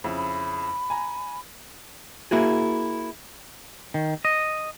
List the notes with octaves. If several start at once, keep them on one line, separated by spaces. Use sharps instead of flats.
F2 C#3 E4
B5
G#5 A#5
A#3 E4 F#4 G#4
D#3
D#5